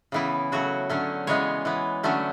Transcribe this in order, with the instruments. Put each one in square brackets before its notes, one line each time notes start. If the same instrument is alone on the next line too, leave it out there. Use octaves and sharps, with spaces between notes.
[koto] C#3 E3 B3 E4
C#3 F#3 A3 F#4
D3 F#3 A3 C#4
C#3 E3 G#3 B3 C#5
E3 B3
D3 F#3 A3 C#4